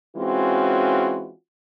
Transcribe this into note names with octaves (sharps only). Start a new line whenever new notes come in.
E3 G#3 C4 C#4 F4 F#4